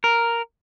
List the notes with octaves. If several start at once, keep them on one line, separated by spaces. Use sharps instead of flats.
A#4